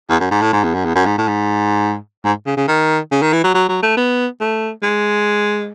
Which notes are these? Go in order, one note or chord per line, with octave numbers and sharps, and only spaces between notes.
E2
F#2
G#2
A2
G#2
E2
F#2
E2
F#2
G#2
A2
G#2
G#2
C#3
C#3
D#3
C#3
D#3
E3
F#3
F#3
F#3
A3
B3
A3
G#3